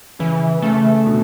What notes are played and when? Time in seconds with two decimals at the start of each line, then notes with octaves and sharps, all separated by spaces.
0.19 C#3 E3
0.62 C#3 A3
1.06 B2 D3